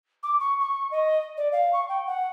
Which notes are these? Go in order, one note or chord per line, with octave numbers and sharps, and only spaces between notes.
D6
C#6
C#6
D#5
D5
F5
C#6
G5
F#5